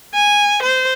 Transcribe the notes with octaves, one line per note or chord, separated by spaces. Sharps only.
G#5
C5